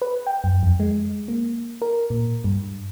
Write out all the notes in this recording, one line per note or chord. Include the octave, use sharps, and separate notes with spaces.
B4
G5
F#2
F2
G#3
A#3
A#4
A#2
G2